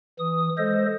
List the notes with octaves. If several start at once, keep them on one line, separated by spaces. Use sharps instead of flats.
E3 D#6
G#3 A4 C5 D#5